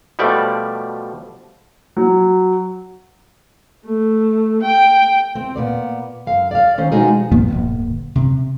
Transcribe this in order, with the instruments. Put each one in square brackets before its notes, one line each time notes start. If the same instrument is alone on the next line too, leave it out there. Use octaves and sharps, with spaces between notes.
[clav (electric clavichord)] B2 F3 G3 A3 D5
[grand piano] F#3
[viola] A3
G5
[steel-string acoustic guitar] C4
A#2 B3 D5
F#2 F5
D5 F5
D#3 C#4 C5
B2 F3 G#3 D#4 F#4 G#4
[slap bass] A#2 F3 A#3 B3
D1 G1 A#2
C3